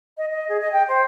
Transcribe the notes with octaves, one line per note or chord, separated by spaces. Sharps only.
D#5
D#5
G#4
D#5
G5
C5